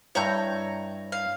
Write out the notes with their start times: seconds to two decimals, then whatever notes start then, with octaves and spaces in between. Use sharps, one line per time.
0.15 G2 E4 C#5 A#5 G6
1.12 F5